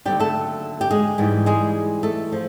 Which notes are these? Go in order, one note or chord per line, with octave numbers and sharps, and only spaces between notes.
D#2 D3 F#3 G3 G4
A3 A4
G4
G#3 G#4
G#2 E3 G3
G#3 G#4
A3 A4
F3 A3